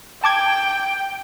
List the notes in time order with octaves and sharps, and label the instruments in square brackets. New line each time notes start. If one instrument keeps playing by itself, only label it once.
[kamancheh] G5 [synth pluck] A5 D6 G#6